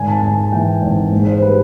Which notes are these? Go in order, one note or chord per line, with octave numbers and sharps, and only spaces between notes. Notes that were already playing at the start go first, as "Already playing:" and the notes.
Already playing: G#1 G#5
A5
G#1 G#5
G#5
E3 G5
G#1
G#2
C5
G3 B4